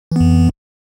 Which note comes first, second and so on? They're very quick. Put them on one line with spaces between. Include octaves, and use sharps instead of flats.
E3 B3 F2